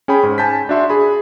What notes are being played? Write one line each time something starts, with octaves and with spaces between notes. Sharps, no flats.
C#4 G#4 G5 B5
G#2
G#5 A5 G6 B6
D4 F#4 E5 C6
G#4 B5